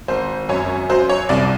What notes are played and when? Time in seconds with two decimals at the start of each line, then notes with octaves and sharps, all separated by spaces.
0.08 G#1 C5
0.49 F#2 C#5
0.89 F#3 C5
1.09 C#5
1.29 C2 D5